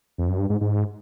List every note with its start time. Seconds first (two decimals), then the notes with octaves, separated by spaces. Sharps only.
0.18 F2
0.28 F#2
0.39 G2
0.50 G#2
0.61 G#2